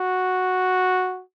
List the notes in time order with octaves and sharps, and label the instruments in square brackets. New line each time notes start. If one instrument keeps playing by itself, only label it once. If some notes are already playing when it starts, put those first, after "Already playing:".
Already playing: [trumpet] F#4